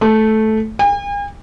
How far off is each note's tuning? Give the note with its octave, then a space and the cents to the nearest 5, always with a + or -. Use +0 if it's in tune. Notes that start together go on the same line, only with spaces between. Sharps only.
A3 -10
G#5 -45